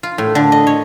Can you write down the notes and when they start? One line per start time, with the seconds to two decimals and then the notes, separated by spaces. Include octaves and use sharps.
0.03 F4
0.18 A2
0.35 D3
0.52 D#5
0.67 C#5